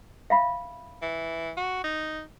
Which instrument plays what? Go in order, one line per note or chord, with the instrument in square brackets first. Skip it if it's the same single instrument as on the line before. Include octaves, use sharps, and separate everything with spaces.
[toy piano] E5 F5 B5
[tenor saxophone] E3
F#4
D#4